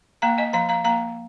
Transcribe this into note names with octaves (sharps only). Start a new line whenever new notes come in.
A#3 F5 A#5
D#5 G#5
F3 F5 A#5
F5 A#5
A#3 F5 A#5